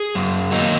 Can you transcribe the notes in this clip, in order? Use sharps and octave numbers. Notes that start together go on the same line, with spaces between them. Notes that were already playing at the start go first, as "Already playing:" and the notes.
Already playing: G#4
F#2
D#3 F#3 A#3 D#4